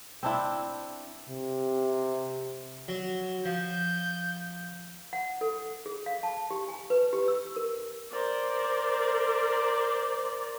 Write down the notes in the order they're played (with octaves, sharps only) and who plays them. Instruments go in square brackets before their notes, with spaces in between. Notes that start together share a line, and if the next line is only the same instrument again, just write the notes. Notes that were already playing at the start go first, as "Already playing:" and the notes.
[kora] C4 D4 E4
[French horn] C3
[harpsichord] F#3
[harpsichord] F3 [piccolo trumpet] G6
[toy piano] F#5
A4
G#4
F5
A5
G4
G#5
B4
G4
E6
A#4
[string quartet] A#4 C5 D5